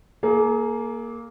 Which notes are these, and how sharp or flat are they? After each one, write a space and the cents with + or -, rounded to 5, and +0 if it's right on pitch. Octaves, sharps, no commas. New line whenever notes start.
A#3 +0 G#4 +35